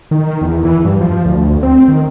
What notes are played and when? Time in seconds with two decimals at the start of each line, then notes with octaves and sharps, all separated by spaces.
0.11 D#3
0.42 E2
0.65 E3
0.85 G2
1.01 F3
1.25 D2
1.63 C4
1.88 D#3